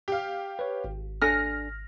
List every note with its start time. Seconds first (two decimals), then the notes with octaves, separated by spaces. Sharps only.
0.08 G4 F5
0.59 B4 C#5
0.84 G#1
1.22 D4 A4 G#5 F6 A#6